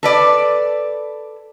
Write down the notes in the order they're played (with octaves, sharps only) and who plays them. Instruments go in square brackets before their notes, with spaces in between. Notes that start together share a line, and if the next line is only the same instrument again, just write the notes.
[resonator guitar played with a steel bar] A4 B4 D5